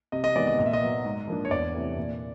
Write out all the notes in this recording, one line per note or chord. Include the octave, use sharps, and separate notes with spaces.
C3 D#5
D#5
D#3 G#3 B3 D5
D#5
A#2 D#5
E5
D#5
F#3 B3
G#2
F3 A#3 D4
C#5
E2 D5
C3 E3 A3
A#2